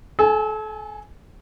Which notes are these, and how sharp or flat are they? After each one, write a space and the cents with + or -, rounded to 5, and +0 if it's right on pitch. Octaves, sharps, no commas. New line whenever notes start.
A4 -35 G#5 +0